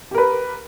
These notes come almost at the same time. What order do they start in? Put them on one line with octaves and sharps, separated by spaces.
G4 A#4 B4